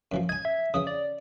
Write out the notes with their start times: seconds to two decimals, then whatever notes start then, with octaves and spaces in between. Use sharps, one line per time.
0.12 F#2 E3 F3
0.29 D#5 G#5 G#6
0.45 E5
0.74 C#3 E3 E5 D#6
0.87 D5